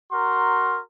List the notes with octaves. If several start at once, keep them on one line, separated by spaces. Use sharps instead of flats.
F#4 A#4 A#5 C6